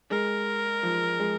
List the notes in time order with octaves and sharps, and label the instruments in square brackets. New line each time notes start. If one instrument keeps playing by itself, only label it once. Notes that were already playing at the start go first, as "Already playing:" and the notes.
[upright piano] G#3 [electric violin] A#4
[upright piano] F3
G#3